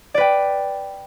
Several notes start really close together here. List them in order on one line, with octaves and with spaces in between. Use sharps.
D5 B4 G5